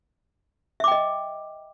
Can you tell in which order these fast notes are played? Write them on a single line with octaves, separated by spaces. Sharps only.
E5 D6 G5 D#5